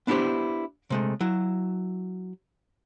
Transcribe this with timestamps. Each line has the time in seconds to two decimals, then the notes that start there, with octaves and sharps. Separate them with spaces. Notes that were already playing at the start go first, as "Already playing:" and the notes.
0.07 B3 D4 E4 F4 G4 C5
0.90 C3 G#3 A3
1.20 F#3 E4